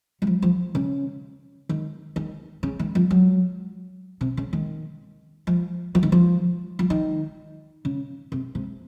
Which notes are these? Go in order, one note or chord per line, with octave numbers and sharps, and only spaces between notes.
F#3
F3
F3
C#3
D#3
D#3
C#3
D#3
F3
F#3
C3
C#3
D#3
F3
F3
D#3
F3
F3
D#3
C#3
C3
C3